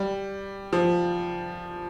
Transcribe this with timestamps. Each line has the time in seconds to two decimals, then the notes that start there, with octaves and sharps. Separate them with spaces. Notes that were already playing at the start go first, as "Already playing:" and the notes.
Already playing: G3
0.73 F3